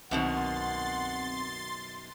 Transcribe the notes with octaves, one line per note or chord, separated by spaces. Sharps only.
C2 F#2 B2 D#3 C4 F#5 C6 A6